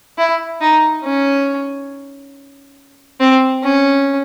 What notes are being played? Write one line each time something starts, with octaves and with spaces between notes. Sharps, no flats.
E4
D#4
C#4
C4
C#4